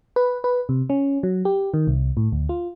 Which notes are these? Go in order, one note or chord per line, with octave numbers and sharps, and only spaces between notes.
B4
B4
C3
C#4
F#3
G4
D#3
C2
A2
D2
F4